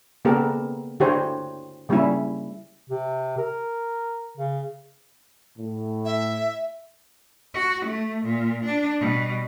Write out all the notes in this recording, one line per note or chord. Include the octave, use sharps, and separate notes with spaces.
C#3 A#3 B3 G4 A4 A#4
D3 E4 F#4 G4 C5 C#5
C#3 G3 A#3 C#4 E4
C3
A#4
C#3
A2
E5
F#4
A3
A#2
D4
B2 G3